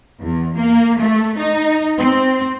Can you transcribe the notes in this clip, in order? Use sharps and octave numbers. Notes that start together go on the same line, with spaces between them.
E2
A#3
A3
D#4
C4